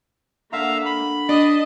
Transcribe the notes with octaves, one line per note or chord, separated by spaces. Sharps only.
D3 A#3 E5 F5 A#5
B5
D4 D#5 A5